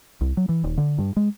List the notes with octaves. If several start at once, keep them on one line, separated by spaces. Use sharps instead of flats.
C2
F#3
E3
D#1
D3
G2
G#3